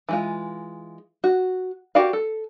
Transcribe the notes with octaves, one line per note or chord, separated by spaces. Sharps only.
E3 G#3 F4
F#4
F#4 G4 A#4 D5 F5
A4